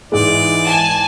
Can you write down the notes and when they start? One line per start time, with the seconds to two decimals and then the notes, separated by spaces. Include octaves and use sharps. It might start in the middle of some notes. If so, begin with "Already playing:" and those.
0.12 G#2 E3 G#3 D5
0.65 G#5 A5